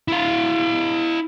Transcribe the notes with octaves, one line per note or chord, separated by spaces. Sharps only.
E4 F5